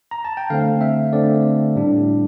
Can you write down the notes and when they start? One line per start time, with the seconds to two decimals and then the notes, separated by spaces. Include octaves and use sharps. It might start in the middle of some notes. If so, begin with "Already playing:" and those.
0.11 A#5
0.25 A5
0.37 G5
0.50 D3 A3 C4 F5
0.81 E5
1.13 D3 A3 C4 D5
1.76 A2 G3 D4